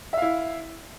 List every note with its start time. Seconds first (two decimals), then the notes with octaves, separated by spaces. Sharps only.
0.13 E5
0.18 F5
0.22 E4